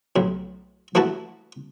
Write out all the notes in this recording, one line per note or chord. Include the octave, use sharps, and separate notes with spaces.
B1 A2
E3 A3 E4 F#4 A5